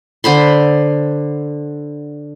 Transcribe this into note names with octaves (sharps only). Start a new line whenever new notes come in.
D3 C5 B5 C6